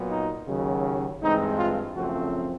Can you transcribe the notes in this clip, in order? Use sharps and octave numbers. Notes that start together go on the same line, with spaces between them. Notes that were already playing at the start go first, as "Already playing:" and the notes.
Already playing: A#2 F#3 B3
D#4
D#2 C#3 F#3
G2 E3 G#3 C4 D#4
F4
F#2 C#3 F3 A3 C4 F#4